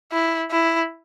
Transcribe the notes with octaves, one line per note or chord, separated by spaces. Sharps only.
E4
E4